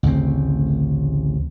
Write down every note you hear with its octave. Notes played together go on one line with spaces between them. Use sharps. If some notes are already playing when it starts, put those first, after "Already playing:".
A1 D2 C#3 C4